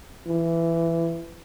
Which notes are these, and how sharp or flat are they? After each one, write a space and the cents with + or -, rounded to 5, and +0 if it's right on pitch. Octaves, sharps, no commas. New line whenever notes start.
E3 +15